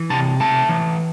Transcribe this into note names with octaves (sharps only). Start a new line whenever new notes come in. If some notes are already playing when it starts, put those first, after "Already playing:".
Already playing: E3
C3 A5
A3 A5
E3